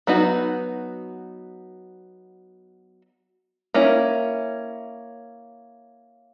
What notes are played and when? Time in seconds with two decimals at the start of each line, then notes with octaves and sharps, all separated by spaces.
0.07 F#3 B3 D#4 F#4
3.74 A#3 C#4 E4